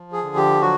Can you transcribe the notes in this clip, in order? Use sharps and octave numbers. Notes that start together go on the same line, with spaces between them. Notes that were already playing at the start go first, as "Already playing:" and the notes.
Already playing: F3
G#4
D3
G4
F#3 F#4